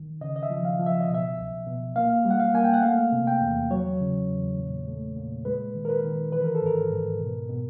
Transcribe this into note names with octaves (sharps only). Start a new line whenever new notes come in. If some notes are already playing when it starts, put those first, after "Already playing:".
Already playing: D#3
C#3 D#5
D#5
E5
F3
F5
F3
E5
D#5
B2
E5
C2
B2
A#3 F5
G3
F#5
F5
A#3 G#5
G5
F#5
A3 F5
C3
G5
E2
F#3 C#5
C#3
E2
A#2
A3
A#2
G#3 B4
D#3
A#4
B4
D#3
E3 B4
A#4
A4
G#2 A#4
G#2
B2
B2